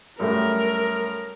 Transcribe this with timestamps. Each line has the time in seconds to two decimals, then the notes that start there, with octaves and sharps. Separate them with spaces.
0.20 F#2 G3 A3 A#4